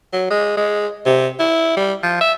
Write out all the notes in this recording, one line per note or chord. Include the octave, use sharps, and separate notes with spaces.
F#3
G#3
G#3
C3
E4
G3
F3
E5